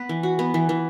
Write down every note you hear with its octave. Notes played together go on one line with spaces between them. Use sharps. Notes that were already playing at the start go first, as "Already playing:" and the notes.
Already playing: B3 B4
E3
F#4
B3
E3
E3